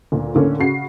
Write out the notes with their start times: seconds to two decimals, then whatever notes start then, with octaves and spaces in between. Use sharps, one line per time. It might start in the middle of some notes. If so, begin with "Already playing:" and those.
0.12 D2 A#2
0.35 A2 D3 A#3 C#4
0.59 C#3 F#4 C7